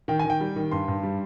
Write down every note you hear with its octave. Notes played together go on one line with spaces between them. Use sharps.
D#3 G5
D#3 G#5
G5
G3
D#3
G2 C6
G2
G3